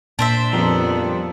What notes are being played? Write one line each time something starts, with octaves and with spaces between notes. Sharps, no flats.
A#2 D4 C5 E5
F2 F3 G3 B3 A#4